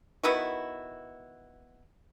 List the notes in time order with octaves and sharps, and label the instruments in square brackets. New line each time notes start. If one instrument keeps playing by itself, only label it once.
[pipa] D#3 B3 E4 F#4